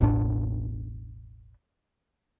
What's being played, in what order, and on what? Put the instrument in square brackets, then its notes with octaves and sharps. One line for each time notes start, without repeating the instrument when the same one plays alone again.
[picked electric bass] E1 A1 A2 D4